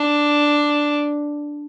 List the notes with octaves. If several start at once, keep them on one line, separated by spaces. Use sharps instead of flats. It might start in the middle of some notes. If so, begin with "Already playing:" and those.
Already playing: D4